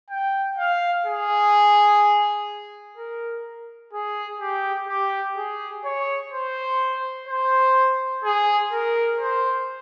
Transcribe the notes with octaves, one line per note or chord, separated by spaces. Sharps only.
G5
F5
G#4
A#4
G#4
G4
G4
G#4
C#5
C5
C5
G#4
A#4
C5